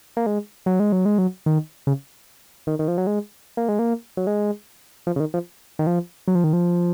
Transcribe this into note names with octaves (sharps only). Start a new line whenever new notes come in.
A#3
G#3
F#3
G#3
F#3
G#3
F#3
D#3
C#3
D#3
D#3
F3
F#3
G#3
A#3
G#3
A#3
F#3
G#3
F3
C#3
D#3
F3
D#3
F3
F#3
F3
D#3
F3